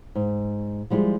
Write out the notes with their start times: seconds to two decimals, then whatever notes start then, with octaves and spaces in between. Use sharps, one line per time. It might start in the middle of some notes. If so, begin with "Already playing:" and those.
0.15 G#2
0.90 F3 G3 G#3 E4 F4